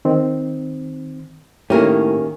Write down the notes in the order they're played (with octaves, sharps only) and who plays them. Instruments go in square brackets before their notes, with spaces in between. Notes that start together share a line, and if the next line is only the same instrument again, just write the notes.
[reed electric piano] D#3 C4
[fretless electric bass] A2 [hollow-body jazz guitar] D#3 A#3 C#4 [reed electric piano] G4 A#4